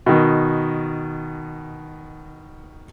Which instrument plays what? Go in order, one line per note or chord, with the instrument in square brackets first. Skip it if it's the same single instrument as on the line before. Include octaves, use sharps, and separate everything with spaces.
[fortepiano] B2 D#3